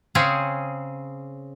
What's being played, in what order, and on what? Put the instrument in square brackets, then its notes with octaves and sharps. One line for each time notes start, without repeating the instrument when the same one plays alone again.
[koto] C#3 C4 C#4 G#4